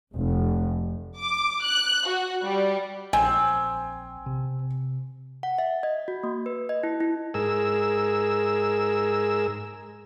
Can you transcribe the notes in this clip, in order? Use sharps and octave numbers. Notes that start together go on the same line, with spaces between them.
F1
D6
F#6
F#4
G3
A#1 C4 G#5
C3
F#5
E5
D#5
F#4
A#3
B4
D#5
E4
E4
G#2 G#4 A#4 E6